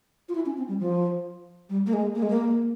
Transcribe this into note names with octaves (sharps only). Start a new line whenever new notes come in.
F4
E4
C#4
C4
G3
F3
G3
A#3
G#3
A#3
G#3
A#3